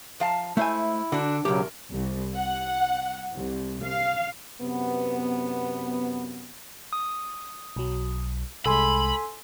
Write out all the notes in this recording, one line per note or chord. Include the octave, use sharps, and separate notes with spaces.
F3 F5 A5
G#3 A3 E4 C5 E5 G#5
D3 D4 F#4
B1 E2 C#3 F#3 G4 A#4
C2
F#5
C2
F5
F#2 C3 B3
D#6
B1 F#3
C2 G#3 A4 G#5 B5 C6